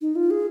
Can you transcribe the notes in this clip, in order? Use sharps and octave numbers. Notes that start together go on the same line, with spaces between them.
D#4
F4
G#4